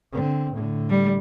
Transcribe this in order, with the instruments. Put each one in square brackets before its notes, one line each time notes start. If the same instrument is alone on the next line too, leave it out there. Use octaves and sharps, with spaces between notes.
[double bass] D3 C4
A2 D3
[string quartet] G3